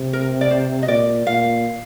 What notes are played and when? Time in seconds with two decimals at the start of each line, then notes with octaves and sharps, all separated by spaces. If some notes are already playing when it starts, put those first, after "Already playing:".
Already playing: C3
0.13 A#4
0.41 D5
0.51 C5
0.83 D#5
0.88 A#2 D5
1.26 A#2 F5